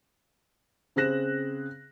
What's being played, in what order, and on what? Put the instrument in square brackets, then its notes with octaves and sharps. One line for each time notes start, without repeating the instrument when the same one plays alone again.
[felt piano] C#3 C4 G#4 F#6 A#6 E7